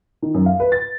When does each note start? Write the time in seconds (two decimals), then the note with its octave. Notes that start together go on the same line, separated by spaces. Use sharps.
0.22 D#3
0.34 F#2
0.46 F5
0.60 B4
0.72 A6